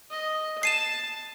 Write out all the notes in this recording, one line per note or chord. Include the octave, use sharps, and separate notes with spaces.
D#5
A5 C7 D#7 E7